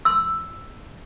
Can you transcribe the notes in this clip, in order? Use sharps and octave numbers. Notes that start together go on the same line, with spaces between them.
C6 E6